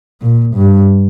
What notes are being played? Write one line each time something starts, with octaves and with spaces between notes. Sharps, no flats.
A#2
G2